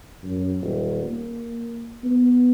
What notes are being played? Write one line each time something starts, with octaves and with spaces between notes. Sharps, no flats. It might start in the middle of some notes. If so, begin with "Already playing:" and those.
F#2
D#1
A#3
B3